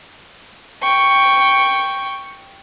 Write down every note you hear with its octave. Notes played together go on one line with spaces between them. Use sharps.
G5 C#6